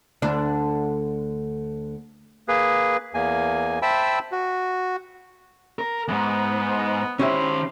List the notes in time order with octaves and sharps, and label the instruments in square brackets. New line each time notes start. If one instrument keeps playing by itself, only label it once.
[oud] D2 D4
[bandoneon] A#3 G#4 B4
E2 A#3 G#5
C5 E5 G5 A5 B5 E6
F#4
[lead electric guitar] A#4
[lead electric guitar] E2 G#2 [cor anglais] B3
[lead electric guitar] D#3 C5 [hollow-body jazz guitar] C#4 G4 E5 [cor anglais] E4